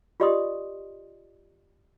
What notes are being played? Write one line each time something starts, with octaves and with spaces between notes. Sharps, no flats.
F4 G4 D5 D#5 C6 D#6